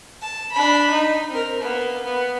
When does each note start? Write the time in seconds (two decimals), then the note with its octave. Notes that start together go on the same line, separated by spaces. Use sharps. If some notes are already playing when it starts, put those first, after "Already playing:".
0.22 A5
0.52 D4 B5
0.90 D#4
1.30 C4 A#4
1.61 A#3 B3
2.04 B3